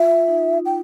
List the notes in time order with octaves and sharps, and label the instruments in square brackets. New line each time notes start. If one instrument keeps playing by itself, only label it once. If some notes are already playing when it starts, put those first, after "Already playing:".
Already playing: [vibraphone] F4 [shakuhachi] E5
[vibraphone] D#4
[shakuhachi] G5